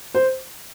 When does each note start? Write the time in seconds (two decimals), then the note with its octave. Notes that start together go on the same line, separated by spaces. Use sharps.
0.14 C5